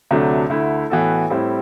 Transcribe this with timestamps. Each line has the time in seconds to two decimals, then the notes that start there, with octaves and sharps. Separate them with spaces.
0.11 D2 C3 F#3 A3 D4
0.50 D2 D3 A3 E4
0.90 A2 E3 B3 F#4 A4
1.30 A2 G3 C4 E4